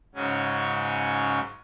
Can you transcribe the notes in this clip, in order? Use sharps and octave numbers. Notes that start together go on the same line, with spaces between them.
G#2 C#3 F#3 C#4